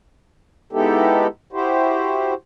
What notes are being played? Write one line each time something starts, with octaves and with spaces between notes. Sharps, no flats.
G#3 B3 D#4 E4 G4 A4
E4 F#4 G4 C5